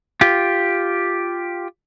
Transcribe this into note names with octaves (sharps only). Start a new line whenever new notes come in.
F4 G4